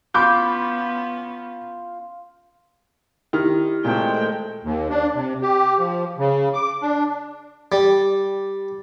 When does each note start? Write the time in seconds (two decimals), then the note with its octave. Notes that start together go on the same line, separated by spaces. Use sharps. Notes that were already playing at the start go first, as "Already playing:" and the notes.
0.14 B3 C#4 F4 B5 C#6 D6 G6
3.33 D#3 E4 G4 F6
3.85 A#2 D#3 G#3 A3 C5 G5
4.63 D#2
4.90 D4
5.15 C3
5.42 G4
5.79 F3
6.18 C#3
6.54 D6
6.82 D4
7.72 G3